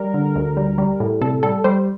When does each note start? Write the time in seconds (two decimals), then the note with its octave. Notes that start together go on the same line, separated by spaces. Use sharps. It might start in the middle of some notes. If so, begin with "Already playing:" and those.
Already playing: G3 A#4
0.14 D3
0.35 D2
0.57 G3
0.78 G3
1.00 A2
1.21 C3 A4
1.43 G3 A4
1.64 G3 C5